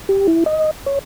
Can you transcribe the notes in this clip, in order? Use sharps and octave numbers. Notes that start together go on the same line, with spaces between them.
G4
E4
D#5
C#5